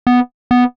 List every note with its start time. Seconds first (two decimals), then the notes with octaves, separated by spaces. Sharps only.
0.07 B3
0.51 B3